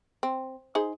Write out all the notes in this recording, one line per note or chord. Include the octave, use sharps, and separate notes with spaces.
C4
D#4 G#4 C5